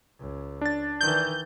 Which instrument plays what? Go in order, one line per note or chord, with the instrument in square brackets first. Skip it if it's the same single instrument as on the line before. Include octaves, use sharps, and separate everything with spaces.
[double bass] C#2
[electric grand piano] D4 A6
[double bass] D#3 E3 [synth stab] G6